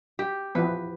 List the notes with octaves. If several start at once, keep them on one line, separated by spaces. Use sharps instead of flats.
G4
E3 F3 B3 B4